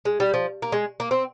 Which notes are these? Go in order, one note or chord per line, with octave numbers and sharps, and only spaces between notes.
G#3
G3
F3
A#3
G#3
A#3
C4